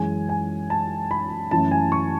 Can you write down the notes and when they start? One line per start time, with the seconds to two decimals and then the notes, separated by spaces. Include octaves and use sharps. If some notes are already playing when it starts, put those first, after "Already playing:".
Already playing: F#2 E3 G#3 C#4 G#5
0.29 G#5
0.70 A5
1.11 B5
1.51 F#2 E3 A3 C#4 A5
1.71 G#5
1.92 C#6